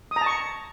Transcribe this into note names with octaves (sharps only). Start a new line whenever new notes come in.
D#6
A#5
A5
C#6